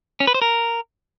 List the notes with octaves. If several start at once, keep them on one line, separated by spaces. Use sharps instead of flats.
C#4
B4
C5
A#4